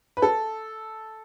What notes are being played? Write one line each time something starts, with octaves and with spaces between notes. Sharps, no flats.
B4
A4